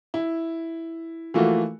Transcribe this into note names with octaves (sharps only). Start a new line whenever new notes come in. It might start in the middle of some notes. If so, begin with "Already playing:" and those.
E4
E3 F3 A3 A#3 F4 F#4